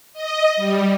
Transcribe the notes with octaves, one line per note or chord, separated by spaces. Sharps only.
D#5
G3